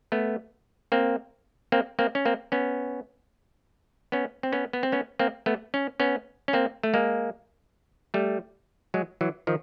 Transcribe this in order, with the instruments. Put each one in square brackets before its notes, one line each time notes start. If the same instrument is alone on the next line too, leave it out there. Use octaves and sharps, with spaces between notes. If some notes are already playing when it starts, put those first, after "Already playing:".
[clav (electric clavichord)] A3 B3
A#3 C4
A#3 C4
A#3 C4
C#4
A#3 C4
B3 C#4
B3 C#4
C4
B3 C#4
B3
C4
B3 C#4
A#3 C4
A3 B3
C#4
B3 C#4
C#4
A#3 C4
A3
G#3 A#3
G3 A3
F#3 G#3
E3 F#3
D#3 F3